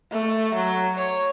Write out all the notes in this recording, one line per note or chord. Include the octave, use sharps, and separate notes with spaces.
A3
F#3
C#5